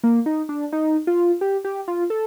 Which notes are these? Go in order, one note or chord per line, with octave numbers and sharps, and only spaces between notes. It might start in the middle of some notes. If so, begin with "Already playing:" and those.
A#3
D#4
D4
D#4
F4
G4
G4
F4
A4